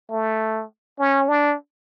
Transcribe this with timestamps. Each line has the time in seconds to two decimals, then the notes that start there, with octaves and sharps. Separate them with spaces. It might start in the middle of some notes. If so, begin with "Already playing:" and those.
0.11 A3
0.99 C#4
1.29 D4